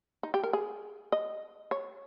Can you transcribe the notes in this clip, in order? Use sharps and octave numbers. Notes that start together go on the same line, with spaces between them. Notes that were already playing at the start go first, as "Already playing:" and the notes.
D#4
G4
A#4
G#4
D#5
C#5